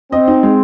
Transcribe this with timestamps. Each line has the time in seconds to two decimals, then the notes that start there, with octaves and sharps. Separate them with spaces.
0.12 C4 D#5
0.28 D#4
0.43 G#3